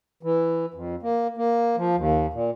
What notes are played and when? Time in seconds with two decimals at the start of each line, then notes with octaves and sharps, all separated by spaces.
0.23 E3
0.74 F2
1.03 A#3
1.37 A#3
1.77 F3
1.96 D#2
2.34 A#2